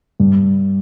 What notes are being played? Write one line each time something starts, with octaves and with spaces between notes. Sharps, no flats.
G2